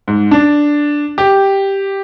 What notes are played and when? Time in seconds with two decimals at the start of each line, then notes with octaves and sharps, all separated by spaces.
0.08 G#2
0.31 D4
1.18 G4